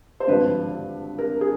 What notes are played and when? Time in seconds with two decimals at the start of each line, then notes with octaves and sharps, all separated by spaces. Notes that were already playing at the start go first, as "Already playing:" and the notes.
0.20 C5
0.27 G#1 G2 D3 F3 B4
1.18 A#4
1.41 G#4